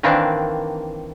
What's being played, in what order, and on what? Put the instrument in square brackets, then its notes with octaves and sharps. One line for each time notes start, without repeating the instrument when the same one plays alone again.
[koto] D#3 E3 A#3 C4 D4